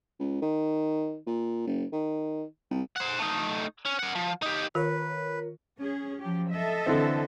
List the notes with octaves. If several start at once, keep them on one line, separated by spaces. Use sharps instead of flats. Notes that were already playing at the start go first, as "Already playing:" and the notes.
C#2
D#3
A#2
F#1
D#3
C2
C5 F#5
A3 D#4
C#4
A#4 F#5
F3
D#4 G4
D#3 F4 A#4 B4 C#5
C#4 G#4
F3 F#3 G4
A4 D#5 E5
D3 E3 C4